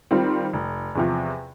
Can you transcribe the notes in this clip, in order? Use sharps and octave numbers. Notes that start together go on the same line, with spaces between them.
D#3 G3 C4 F4
F1
E2 C3 F3